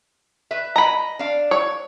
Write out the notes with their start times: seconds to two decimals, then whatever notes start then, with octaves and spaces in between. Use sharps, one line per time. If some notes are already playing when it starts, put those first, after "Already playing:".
0.51 B4 E5
0.76 D#5 A#5 B5
1.19 D4 F5
1.51 C#5